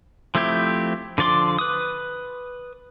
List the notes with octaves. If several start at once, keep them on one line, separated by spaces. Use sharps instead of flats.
F3 A3 C4 E4 G4
D3 F3 D5 C6 D6
B4 D#6